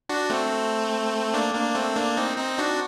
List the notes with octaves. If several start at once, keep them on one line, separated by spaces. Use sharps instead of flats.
D4 F#4
A3 C4
A#3 D4
A#3 D4
A3 C4
A#3 D4
C4 D#4
C4 D#4
D4 F#4